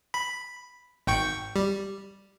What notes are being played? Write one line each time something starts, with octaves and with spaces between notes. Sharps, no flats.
B5
G#1 G5 C#6
G3